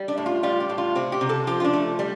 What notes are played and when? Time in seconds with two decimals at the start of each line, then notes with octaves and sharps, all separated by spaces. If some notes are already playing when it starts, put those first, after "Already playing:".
Already playing: G3
0.08 D4
0.18 A2
0.26 F4
0.43 G3 F4
0.60 G4
0.69 A2
0.78 F4
0.95 C3 C4
1.12 G4
1.21 C3
1.29 A4
1.47 F3 G4
1.60 F4
1.64 D4
1.73 A3
1.99 G3